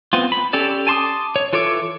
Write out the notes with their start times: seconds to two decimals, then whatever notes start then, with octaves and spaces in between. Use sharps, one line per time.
0.13 B3 C4 F4
0.32 B5
0.53 C#4 G4 A4 D5
0.87 G#5 A5 C6 D6 D#6
1.36 C#5
1.53 E3 F4 A4 C#5 D6